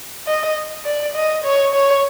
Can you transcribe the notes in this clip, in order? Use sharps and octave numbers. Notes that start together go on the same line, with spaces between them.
D#5
D5
D#5
C#5
C#5